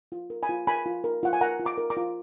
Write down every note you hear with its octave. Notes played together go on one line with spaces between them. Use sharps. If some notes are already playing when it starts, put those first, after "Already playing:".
F4
A#4
G#5 B5
F4
A#4 G#5 B5
F4
A#4
F4 F#5
G#5
A#4 F#5 A#5
F4
A#5 D6
A#4
A#5 D6
F4